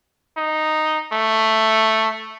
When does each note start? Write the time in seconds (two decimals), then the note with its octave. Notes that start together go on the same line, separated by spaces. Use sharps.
0.37 D#4
1.13 A3